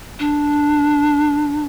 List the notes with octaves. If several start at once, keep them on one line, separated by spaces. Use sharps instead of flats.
D4